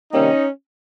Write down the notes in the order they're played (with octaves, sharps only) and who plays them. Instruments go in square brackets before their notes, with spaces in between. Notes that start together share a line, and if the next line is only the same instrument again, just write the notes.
[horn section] C3 D#3 G3 A#3 C#4 D#4